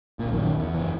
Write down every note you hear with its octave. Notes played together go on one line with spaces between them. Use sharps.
D1 A#2
A#1 F#2 D#3
E2
F#1 E3